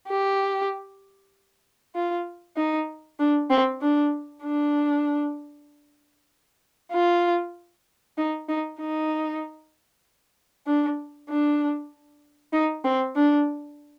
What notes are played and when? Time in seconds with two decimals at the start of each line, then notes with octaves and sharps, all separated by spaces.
0.08 G4
1.95 F4
2.57 D#4
3.20 D4
3.50 C4
3.82 D4
4.44 D4
6.93 F4
8.18 D#4
8.49 D#4
8.80 D#4
10.67 D4
11.29 D4
12.53 D#4
12.84 C4
13.16 D4